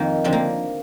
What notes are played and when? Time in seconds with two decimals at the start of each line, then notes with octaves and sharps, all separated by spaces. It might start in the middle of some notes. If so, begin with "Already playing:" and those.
Already playing: F2 D#3 A#3
0.24 D3 F3 C4
0.33 A#3